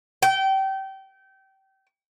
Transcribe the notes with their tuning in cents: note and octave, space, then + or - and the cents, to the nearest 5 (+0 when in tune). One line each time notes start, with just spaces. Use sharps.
G5 -25